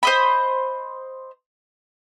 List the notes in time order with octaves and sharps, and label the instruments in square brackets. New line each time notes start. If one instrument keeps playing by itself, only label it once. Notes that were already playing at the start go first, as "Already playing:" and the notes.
[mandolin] C5 D#5 B5